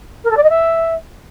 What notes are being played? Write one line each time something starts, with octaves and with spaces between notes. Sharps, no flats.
A#4
A4
D5
D#5
E5